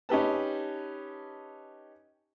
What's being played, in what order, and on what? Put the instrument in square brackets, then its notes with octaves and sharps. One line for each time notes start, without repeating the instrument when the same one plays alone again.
[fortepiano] C#4 D#4 G4 B4 A5